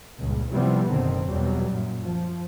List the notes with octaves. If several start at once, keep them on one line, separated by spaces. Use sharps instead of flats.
C#2 G2 A#2
C3 E3 F3 G3 B3 C4
F#1 B2 D3 D#3 C4
E2 B2 F#3 G3
F#2 A#2
F3